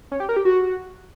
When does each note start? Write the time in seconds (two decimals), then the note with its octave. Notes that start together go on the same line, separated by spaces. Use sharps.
0.12 C#4
0.20 G4
0.29 A#4
0.36 G4
0.45 F#4